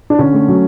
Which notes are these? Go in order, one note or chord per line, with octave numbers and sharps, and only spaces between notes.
D4
D3 C#4
A3
F#3